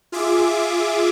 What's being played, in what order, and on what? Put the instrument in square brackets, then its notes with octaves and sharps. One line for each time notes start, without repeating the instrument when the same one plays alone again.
[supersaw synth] F4 G#4 E5 D6